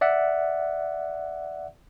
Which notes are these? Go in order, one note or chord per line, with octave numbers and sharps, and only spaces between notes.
D5 E5 F#5